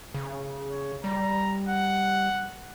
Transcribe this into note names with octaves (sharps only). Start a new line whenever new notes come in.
C#3
C#5
G3 A#5
F#5